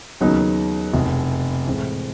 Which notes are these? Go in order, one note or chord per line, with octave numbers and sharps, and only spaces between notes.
D#2 C#3 F#3 B3 D#4
F1 E2 B2
A2 E3 G#3 C4